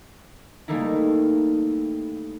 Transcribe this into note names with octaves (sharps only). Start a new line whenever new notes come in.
G3 A3 A#3 D#4 E4